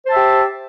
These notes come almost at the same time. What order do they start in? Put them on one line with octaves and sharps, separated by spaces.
C5 A5 E5 G4